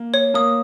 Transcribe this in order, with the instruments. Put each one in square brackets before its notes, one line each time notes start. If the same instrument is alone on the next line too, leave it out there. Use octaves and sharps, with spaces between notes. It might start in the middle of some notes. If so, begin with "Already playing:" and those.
Already playing: [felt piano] A#3
[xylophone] C#5
[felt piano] A#3 [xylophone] D#6